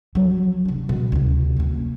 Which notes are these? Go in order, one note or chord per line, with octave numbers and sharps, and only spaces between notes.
F3 F#3
F1 D4
B2 G3
D2 C3
F#2 A#3